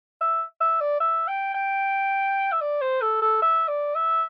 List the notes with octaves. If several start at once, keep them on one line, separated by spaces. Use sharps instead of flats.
E5
E5
D5
E5
G5
G5
E5
D5
C5
A4
A4
E5
D5
E5